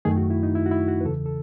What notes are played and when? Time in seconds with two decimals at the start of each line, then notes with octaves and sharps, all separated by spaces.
0.05 F#2 D#3 A3 G#4
0.17 F#4
0.30 E4
0.43 D#4
0.55 E4
0.66 F#4
0.71 E4
0.88 F#4
1.01 B4
1.05 E2 C#3 E3 A4
1.26 A4